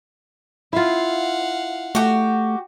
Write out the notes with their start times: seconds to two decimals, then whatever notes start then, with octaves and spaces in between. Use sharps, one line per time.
0.73 E4 F4 F5 F#5
1.95 A3 F#4 G4